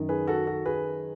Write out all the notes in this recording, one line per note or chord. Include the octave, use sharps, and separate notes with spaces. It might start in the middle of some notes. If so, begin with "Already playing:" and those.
Already playing: F#2 D#3
G#4 B4
F#4 A4
F#4 A4
G#4 B4